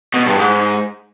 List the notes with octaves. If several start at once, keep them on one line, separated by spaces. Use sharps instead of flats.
B2
G2
G#2